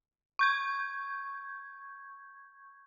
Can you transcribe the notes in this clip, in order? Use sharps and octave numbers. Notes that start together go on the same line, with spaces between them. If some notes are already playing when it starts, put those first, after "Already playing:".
C#6 G6 G#6